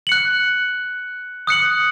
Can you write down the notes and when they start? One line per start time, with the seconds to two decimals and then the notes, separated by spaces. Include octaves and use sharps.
0.07 F#6 C#7 F#7
1.47 D#6 F#6 C#7 F#7